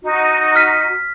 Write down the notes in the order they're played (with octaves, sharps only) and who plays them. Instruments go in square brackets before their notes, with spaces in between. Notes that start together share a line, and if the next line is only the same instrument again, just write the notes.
[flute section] D#4 F#4
[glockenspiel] F6 B6